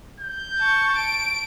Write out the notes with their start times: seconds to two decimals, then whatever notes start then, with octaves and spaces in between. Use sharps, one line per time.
0.20 G6
0.58 A5 C#6
0.96 D7